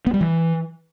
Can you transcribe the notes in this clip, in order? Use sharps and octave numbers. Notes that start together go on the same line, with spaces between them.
B3
G3
E3